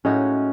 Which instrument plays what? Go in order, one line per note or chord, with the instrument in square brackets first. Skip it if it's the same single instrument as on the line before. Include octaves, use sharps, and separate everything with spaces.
[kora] A2 G#3 D#4 F#4 [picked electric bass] C#4